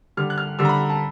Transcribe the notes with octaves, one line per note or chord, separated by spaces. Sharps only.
D3 G3 F6
F#6
F6
D3 G3 E6
A#5
B5
A5